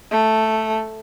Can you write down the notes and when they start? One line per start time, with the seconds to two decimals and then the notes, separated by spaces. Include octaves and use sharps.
0.11 A3